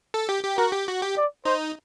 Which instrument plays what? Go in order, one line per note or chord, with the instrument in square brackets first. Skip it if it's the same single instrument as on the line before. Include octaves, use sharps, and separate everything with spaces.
[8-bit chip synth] A4
G4
G4
[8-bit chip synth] F#4 [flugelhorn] A#4
[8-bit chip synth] G4
F#4
G4
[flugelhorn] D5
[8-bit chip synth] D#4 [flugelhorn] C5